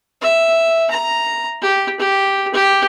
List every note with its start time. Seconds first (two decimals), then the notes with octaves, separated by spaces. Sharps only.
0.22 E5
0.90 A#5
1.62 G4
1.99 G4
2.54 G4